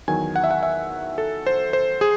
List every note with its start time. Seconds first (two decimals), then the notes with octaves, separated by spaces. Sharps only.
0.08 E2 D#3 F#3 G#5
0.36 F#5
0.44 E5
0.51 F#5
0.63 E5
1.18 A4
1.46 C5
1.73 C5
2.01 G#4